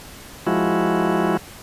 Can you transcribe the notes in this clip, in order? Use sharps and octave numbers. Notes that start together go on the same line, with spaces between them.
F3 G#3 E4 F#4